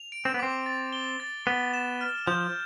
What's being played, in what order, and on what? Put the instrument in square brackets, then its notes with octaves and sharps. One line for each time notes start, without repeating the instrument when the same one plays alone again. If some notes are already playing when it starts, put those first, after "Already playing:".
Already playing: [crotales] F7
D7
[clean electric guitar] C4
B3
[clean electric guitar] C4 [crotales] D6
[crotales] A6
G7
A6
[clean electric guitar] B3 [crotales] G7
[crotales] E7
F6
[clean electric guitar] F3 [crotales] G6